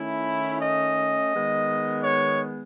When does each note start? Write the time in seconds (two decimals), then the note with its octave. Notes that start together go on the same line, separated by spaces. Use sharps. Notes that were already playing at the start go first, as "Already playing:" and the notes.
Already playing: D#3 A3 C#4 E4
0.61 D#5
1.32 D#3 G#3 B3
2.03 C#5